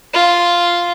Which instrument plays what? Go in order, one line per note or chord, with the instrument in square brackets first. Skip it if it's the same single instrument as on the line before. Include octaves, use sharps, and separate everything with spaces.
[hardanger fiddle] F4